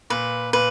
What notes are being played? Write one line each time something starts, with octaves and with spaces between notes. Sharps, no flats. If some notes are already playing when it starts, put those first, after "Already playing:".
A#2 B4
A#2 B4